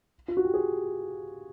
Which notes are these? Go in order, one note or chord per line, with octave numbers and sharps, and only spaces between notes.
F4
F#4
G4
G#4